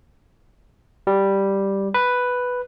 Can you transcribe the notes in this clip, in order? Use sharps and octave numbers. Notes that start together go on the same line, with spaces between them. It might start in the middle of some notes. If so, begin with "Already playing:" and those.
G3
B4